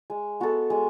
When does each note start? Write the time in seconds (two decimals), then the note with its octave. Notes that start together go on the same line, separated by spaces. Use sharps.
0.10 G#3
0.40 B3 F#4 A4
0.70 G#3